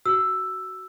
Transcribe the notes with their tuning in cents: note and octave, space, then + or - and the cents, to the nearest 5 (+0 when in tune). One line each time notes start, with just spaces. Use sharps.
F#4 +15 E6 +5